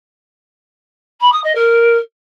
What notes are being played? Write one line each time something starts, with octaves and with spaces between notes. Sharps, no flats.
B5
D#6
D#5
A#4